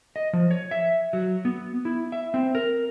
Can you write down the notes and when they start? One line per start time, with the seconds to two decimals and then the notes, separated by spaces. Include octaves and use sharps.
0.16 D#5
0.33 F3
0.51 C#5
0.71 E5
1.13 F#3
1.45 B3
1.85 E4
2.12 E5
2.34 C4
2.55 A#4